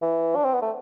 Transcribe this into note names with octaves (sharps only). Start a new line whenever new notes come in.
E3
D4
C4
B3
A3